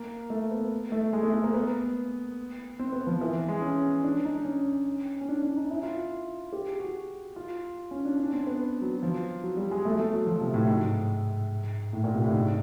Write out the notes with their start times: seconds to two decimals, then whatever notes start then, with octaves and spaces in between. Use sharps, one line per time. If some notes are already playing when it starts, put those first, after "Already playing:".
Already playing: A#3
0.30 A3
0.51 B3
0.92 A3
1.13 G#3
1.23 A3
1.34 A3
1.44 A#3
1.54 B3
2.79 C4
2.92 B3
3.07 F3
3.21 E3
3.48 G#3
3.62 C#4
4.04 D4
4.25 D#4
4.45 C#4
5.21 C#4
5.29 D4
5.42 D4
5.57 D#4
5.71 E4
5.83 F4
6.53 G4
6.67 G#4
6.80 F#4
7.36 F4
7.91 C#4
8.05 D4
8.20 D4
8.33 C4
8.47 B3
8.82 F#3
9.03 F3
9.44 F#3
9.57 G3
9.71 G#3
9.85 A3
10.00 A3
10.13 F#3
10.27 F3
10.41 C3
10.54 A2
10.68 G#2
11.93 A2
12.04 A#2
12.14 C3
12.24 A2
12.34 G#2